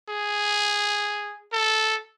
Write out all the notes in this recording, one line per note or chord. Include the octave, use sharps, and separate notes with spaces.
G#4
A4